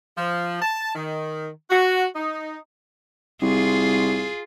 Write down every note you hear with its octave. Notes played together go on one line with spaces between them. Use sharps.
F3
A5
D#3
F#4
D#4
C2 F4 G#4